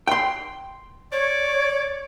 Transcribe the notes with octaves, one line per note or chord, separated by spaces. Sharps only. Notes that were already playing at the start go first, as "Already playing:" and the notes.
G5 C6
C#5 D5